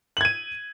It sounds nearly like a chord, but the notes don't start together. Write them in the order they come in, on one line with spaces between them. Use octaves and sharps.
F#7 G#6 D#7